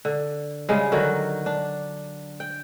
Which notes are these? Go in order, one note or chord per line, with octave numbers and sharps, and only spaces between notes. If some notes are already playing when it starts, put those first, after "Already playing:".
D3
C#3 G3 G#3
D3 D#3 F#3 F#4
D4
G5